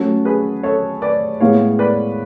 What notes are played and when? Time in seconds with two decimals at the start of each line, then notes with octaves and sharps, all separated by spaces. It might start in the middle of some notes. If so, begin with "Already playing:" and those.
Already playing: F#3 A3 C#4 F#4 A4
0.25 G#4 B4
0.63 A4 C#5
1.02 B4 D5
1.40 A2 G#3 B3 C#5 F5
1.79 B4 D5